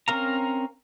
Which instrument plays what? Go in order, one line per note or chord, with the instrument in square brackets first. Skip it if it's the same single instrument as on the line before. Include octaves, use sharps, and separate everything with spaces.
[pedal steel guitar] C4 C#4 A#4 F5 A#5